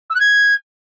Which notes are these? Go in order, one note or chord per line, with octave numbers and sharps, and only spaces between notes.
E6
F#6
G#6